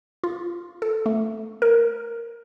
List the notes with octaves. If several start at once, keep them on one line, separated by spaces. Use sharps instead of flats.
F4
A4
A3
A#4